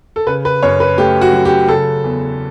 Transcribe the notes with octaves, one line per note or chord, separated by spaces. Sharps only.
A4
C#3 B4
B4
F#2 C#5
B4
A3 G4
F#4
F#3
G4
C#3 A4
E2